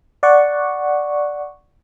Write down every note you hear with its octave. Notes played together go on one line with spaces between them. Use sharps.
D5 F#5 C#6